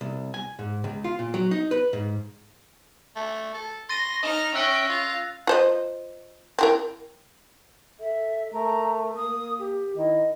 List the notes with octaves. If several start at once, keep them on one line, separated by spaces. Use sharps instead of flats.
C2
G#5
G#2
C#2
F4
A#2
F#3
D#4
B4
G#2
A3
A4
C6 A6 A#6 D#7
D#4 D#5 F6
C#4 E5 G5 E6 F#6 A#6
F4 F5
F4 C5 D#5
C4 E4 A#4
A4 E5
A3 A#4 A#5
A#3 D#6
G4
D#3 E4 D#5